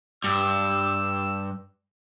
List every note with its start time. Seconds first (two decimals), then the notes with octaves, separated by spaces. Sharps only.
0.24 G2 E6